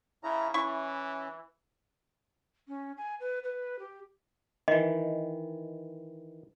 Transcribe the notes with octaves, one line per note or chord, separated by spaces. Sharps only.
C#3 E4 A#5
E3 C#4 E4 C#6
C#4
G#5
B4
B4
G4
D#3 E3 D#5